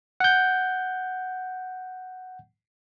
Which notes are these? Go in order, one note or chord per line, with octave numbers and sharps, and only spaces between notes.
F#5 G6